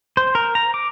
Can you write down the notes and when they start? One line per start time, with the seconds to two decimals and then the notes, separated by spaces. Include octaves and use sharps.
0.17 C5
0.35 A#4
0.55 A#5
0.74 D6